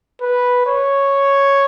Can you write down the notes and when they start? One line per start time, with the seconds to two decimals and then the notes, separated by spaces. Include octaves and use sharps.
0.21 B4
0.66 C#5